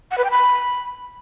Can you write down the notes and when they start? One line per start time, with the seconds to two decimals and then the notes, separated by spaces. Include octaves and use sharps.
0.11 F#5
0.18 B4
0.24 G5
0.31 B5